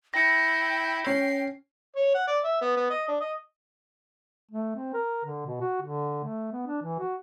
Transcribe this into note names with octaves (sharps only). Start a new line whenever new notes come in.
E4 G5 A#6 C#7
C#4 C7
C#5
F#5
D5
E5
B3
B3
D#5
D4
D#5
A3
C4
A#4
D3
B2
F#4
D3
A3
B3
D4
E3
F#4